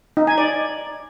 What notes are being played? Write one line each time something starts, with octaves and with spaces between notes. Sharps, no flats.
D#4
G#5
D5